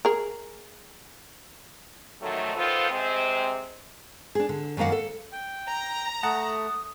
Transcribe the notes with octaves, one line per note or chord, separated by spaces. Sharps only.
G#4 A#4
G#2 D#3 F3 F#3 A3
D#3 F3 B3 F4 A4 C5
C3 G#3 C4
D4 G#4
D3
F#2 D#3 A#3 F5 F#5
A4
G5
A#5
A3 F#5 A5 D#6